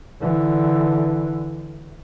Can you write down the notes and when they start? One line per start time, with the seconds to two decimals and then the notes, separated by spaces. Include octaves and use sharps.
0.21 D3 E3